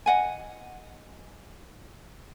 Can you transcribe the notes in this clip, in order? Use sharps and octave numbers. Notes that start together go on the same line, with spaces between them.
D#5 F#5 G#5